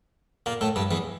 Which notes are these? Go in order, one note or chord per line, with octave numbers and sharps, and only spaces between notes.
A#2 A#3
A2 A3
G2 G3
E2 E3